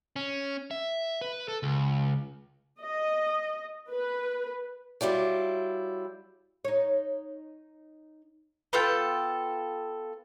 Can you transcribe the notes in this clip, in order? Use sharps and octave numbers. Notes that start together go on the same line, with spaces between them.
C#4
E5
B4
A4
C#2
D#5
B4
F#3 G3 E4 F4
D#4 C#5
B3 F4 A4 G5